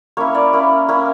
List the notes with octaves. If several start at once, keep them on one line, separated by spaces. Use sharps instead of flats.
A#3 C#4 E4 C#5
D5
A#3 C#4 E4
A#3 C#4 E4